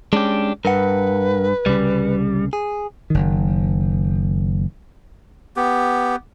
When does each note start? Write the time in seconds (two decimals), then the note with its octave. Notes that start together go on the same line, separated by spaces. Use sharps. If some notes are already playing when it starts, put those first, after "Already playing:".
0.13 G#3 C#4 D4 G4
0.65 G2 A#4 B4 F#5
1.66 C2 C#3 G3
2.53 G#4
3.10 F#1 D#3
5.56 B3 G4